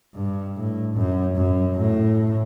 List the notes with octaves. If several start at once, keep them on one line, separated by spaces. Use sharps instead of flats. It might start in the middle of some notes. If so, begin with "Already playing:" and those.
G2
A2
F#2
F#2
A2